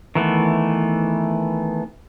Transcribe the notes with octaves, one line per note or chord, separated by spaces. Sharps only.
D#3 E3 A3 B3